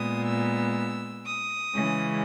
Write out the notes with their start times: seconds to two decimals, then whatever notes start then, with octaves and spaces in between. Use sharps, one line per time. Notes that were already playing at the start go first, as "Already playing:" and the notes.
Already playing: A#2 G#3 B3 D#6
0.26 E6
1.25 D#6
1.74 C#3 E3 G#3 C#4